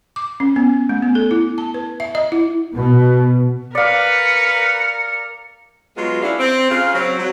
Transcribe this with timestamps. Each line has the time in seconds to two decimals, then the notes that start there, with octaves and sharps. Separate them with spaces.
0.16 D6
0.40 C#4
0.56 B3
0.89 A3
1.02 B3
1.15 A4
1.31 E4
1.58 A5
1.74 B4
2.00 E5
2.15 D#5
2.32 E4
2.73 B2
3.75 A#4 B4 D5 F5 C#7
5.96 F#3 G#3 B3 F4
6.22 C#4 D4 E4 F5
6.38 C4
6.70 C#3 F4 G#4 F5
6.93 F#3 C4
7.19 F#3